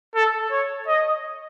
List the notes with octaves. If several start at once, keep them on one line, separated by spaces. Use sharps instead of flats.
A4
C#5
D#5